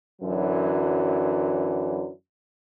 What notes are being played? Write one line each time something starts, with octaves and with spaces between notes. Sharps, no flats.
F#2 D3 E3 F#3